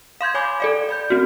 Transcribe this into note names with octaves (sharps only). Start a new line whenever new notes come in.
F5 C6 G6 G#6
C#5 G#5 B5 D6
A4 D5 F5
D5 B5 G6
C4 F#4